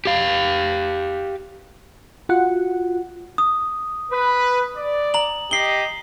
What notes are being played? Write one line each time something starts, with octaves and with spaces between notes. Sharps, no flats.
G4 F5
F4 F#4 F#5
D#6
B4
D5
A#5 F#7
G4 D#5 C7 G7